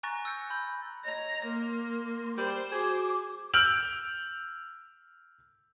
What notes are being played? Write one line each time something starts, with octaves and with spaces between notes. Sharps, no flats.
G#5 A#5 C#6 F#6 A6 A#6
E6 G6 C#7
B5 C6 G6
C#5 D#5 A#5
A#3 A#4 C6
G3 C5
F#4 G#4 D6
E6 F6 G6 D7 F7 F#7